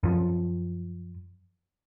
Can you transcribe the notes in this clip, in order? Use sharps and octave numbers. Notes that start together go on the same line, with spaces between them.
F#2 F3